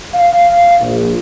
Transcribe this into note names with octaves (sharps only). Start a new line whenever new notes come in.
F5
A#1